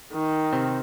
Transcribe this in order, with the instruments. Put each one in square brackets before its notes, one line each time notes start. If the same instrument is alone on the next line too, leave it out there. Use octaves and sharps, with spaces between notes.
[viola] D#3
[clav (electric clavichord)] C3 C4